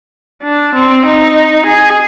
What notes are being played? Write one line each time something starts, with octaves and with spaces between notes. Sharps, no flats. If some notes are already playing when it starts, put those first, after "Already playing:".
D4
C4
D#4
G#4